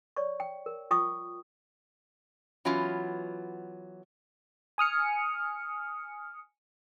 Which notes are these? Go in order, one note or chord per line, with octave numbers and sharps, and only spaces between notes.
C#5 D5 C#6
G5
A#4
F4 G5 C#6 D#6
E3 F#3 B3 C#4 F4
G#5 D#6 F6 C#7